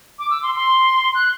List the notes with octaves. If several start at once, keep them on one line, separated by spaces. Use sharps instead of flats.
D6
E6
C6
C6
F#6